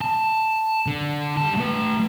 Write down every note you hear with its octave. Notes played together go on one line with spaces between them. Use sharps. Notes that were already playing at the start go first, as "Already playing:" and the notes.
A5
D3
G3 A5
A3 B4